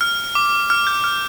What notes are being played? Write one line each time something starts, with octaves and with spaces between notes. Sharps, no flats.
F6
D6
F6
G6
F6